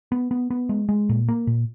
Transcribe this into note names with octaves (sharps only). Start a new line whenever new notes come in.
B3
B3
B3
G#3
G#3
A#2
A#3
A#2